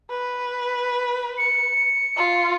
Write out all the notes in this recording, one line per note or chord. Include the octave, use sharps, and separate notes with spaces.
B4
C#7
F4